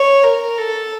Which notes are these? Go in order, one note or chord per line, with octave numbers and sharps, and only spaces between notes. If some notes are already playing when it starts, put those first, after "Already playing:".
Already playing: C#5
A#4
A4